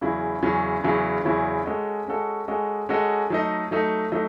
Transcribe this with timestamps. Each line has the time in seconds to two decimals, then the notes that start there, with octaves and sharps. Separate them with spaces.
0.01 E2 C#3 F#3 C#4 E4
0.42 E2 C#3 F#3 C#4 E4
0.84 E2 C#3 F#3 C#4 E4
1.25 E2 C#3 F#3 C#4 E4
1.66 G#3 C#4 F#4 A4 D#5
2.07 G#3 C#4 F#4 A4 D#5
2.48 G#3 C#4 F#4 A4 D#5
2.89 G#3 C#4 F#4 A4 D#5
3.30 F#3 A3 D#4 A4 D#5
3.71 F#3 A3 D#4 A4 D#5
4.12 F#3 A3 D#4 A4 D#5